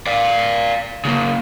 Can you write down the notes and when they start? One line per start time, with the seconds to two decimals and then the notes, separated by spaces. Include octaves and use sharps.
0.07 D5 F5
1.05 C#3 A#3